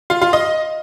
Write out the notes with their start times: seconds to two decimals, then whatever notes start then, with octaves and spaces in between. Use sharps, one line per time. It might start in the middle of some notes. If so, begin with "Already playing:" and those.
0.10 F4
0.22 F4
0.33 D#5